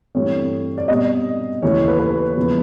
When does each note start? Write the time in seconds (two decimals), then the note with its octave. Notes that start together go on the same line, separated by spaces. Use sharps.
0.15 G2 E3 A3 C4 C#5
0.78 D5
0.88 B2 G3 C4 D#5
1.62 D#2 C#3 E3 A3 C#5
1.88 B4
2.00 B4
2.36 E2 C#3 F3 G#3 B3